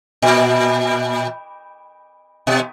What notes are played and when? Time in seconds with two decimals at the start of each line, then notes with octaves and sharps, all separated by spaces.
0.22 A#2
2.47 B2